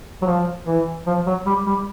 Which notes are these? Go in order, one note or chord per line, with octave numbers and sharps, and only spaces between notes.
F#3
F3
E3
F3
F#3
G3
G3